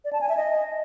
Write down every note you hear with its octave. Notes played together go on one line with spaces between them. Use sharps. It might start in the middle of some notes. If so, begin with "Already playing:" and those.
D5
A5
G#5
E5
D#5